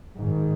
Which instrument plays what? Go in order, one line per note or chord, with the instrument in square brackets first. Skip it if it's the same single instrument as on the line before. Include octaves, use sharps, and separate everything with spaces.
[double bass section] G#2 D#3